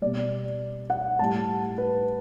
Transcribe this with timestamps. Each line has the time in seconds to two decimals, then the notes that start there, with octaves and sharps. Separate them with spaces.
0.02 B2 G3 D5
0.90 F#5
1.19 A2 G3 A5
1.78 B4